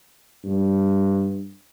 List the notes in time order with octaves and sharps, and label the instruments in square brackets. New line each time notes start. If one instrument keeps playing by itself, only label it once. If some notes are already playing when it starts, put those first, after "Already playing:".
[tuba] G2